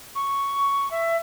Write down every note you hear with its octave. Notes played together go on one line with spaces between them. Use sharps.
C#6
E5